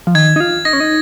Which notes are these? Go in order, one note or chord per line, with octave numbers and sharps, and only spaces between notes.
F3
D#3 G#6
D#4
F4
D#4 A#6
C#4
D#4